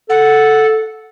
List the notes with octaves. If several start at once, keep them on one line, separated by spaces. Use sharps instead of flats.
A4 F#5